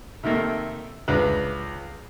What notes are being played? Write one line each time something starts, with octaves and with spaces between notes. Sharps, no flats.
C3 D#3 A3 A#3
C#2 D4 B4